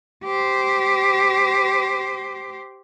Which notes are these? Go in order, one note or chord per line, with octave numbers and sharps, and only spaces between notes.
G4 C5